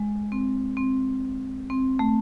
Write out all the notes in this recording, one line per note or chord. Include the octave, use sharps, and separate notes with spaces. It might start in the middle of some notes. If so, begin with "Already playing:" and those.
Already playing: G#3
C4
C4
C4
A3